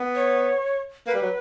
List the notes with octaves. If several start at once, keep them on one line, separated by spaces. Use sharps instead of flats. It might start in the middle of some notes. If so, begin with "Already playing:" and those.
Already playing: B3
C#5
A#3 B4
G3
F#3